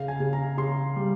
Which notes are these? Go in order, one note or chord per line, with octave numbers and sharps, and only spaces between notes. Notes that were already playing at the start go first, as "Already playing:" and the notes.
Already playing: C#3 F5
G#5
C#3
A#5
C#3 C6
G3